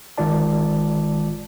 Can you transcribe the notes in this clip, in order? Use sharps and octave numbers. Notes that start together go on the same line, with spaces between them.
G1 D#3 G#3 F4 D5 A5